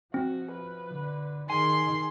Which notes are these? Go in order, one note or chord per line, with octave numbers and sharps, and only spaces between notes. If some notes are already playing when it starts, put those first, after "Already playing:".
F3 C4 F#4
B4
D3
D#3 G#4 G#5 C6